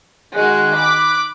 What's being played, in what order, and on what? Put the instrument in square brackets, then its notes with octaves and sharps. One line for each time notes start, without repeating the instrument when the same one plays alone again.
[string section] D#3 G#3 F#4 [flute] F#6
[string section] B5 D6